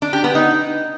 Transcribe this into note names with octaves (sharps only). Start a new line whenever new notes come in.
D4
G4
B3
D#4